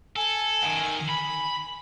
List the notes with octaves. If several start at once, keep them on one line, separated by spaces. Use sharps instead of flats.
A4 G#5
F#2 D#3
B5